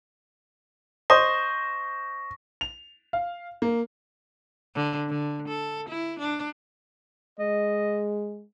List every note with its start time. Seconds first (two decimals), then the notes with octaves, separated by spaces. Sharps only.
1.10 C5 D#5 C#6 A#6
2.61 F7
3.13 F5
3.62 A#3
4.75 D3
5.09 D3
5.48 A4
5.89 E4
6.19 D4
7.40 G#3 D#5